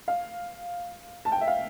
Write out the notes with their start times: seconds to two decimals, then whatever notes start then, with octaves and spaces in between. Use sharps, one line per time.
0.08 F5
1.25 A5
1.32 G5
1.41 E5
1.47 F5